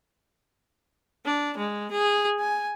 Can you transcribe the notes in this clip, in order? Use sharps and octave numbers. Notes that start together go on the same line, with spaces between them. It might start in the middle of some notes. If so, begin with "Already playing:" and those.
D4
G#3
G#4
G#5